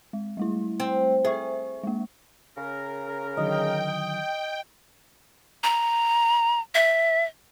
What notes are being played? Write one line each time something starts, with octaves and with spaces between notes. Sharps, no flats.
G#3
G3 A3 E4
C4
G#4 C5 E5 C#6
G#3 A#3
C#3 A#4
D3 D#3 F#3 D#5 G5
A#5
E5